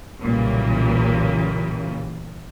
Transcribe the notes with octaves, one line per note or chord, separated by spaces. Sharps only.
B1 A#2 C#3 E3 G3 A#3